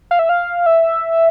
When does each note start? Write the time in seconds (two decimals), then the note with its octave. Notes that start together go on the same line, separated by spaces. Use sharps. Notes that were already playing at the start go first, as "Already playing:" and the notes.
0.11 F5
0.19 E5
0.29 F5
0.66 E5